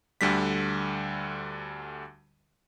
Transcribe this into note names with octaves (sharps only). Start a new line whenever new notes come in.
D2 D3 G3 B6